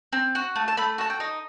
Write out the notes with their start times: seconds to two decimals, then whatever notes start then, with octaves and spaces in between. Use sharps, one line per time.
0.13 C4
0.35 F#4
0.56 A3
0.68 A5
0.77 A3 B5
0.98 F#4 A5
1.10 G5
1.20 D#4